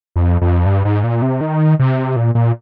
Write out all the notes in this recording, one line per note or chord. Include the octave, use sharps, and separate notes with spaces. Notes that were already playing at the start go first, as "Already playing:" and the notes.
F2
F2
G2
G#2
A#2
C3
D#3
C3
A#2
A#2